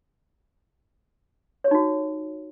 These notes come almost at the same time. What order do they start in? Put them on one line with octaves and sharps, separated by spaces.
C#5 G4 D#4 F#4